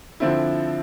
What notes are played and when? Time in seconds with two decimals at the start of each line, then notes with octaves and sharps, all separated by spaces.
0.20 D3 F3 C4 E4